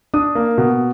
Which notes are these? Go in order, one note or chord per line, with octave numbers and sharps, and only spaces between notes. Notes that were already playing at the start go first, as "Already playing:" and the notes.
D4 D#6
A#3
B2